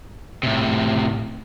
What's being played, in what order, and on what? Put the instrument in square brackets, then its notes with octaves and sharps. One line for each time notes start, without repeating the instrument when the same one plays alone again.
[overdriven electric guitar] A2 C3